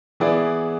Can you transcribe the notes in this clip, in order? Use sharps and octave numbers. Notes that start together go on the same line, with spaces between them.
E3 B3 E4 G#4 D5